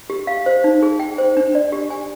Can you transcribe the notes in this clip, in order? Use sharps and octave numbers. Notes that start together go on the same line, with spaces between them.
G4
F5
C5
D#4
G#4
G5
C5
D4
D5
G4
G#5